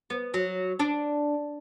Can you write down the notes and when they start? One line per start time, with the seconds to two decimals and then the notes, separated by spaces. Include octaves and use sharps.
0.10 B3
0.34 F#3
0.79 D4